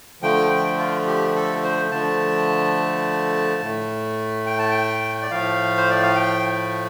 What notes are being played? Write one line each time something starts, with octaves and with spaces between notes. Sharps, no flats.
D3 F3 A3 G5
G5
F4
G4
A4
C5
D3 F3 A3 A5
A2 A3
G5
A5
G5
D5
A2 F3 A3 F5
C5
D5
F5
G5